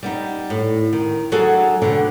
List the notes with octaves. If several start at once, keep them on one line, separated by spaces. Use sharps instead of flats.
G3 B3 D#4
A2
D#3
F#3 D4 F#4 G#4 A4
B2 D3 C4